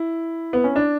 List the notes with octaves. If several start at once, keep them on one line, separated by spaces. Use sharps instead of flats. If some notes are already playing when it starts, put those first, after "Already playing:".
Already playing: E4
B3
C#4
D4